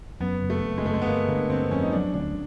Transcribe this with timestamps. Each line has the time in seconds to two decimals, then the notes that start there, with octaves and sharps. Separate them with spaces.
0.20 F#2 B3
0.42 F#1
0.50 A3
0.63 F#1
0.78 G#3
0.85 F#1 A3
0.94 G#3
1.02 B3
1.06 G1 A#3
1.29 D3 A#3
1.50 G1 C4
1.71 F2 C#4
1.82 D#4
1.93 F#3 D4
2.14 D2 D4